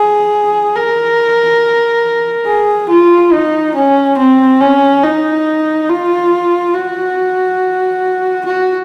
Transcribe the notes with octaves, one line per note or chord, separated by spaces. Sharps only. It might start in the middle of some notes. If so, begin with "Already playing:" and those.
Already playing: G#4
A#4
G#4
F4
D#4
C#4
C4
C#4
D#4
F4
F#4
F#4